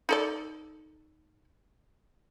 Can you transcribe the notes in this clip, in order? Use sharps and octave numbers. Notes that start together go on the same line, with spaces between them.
D#4 A4 D5